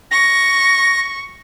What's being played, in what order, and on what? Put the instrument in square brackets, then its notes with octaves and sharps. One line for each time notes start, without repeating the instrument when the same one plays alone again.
[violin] C#6 [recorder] A#6